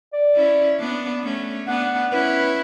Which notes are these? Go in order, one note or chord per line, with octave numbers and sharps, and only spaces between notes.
D5
C#4 E4
B3 D4
A3 C#4
B3 D4 F#5
C#4 E4 B4